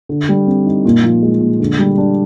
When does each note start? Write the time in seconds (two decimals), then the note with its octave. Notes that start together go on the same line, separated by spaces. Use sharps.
0.09 D3
0.29 G3
0.47 C4
0.66 D#4
0.85 A#2
1.03 F3
1.22 G#3
1.41 A#2
1.60 D3
1.79 G3
1.98 D4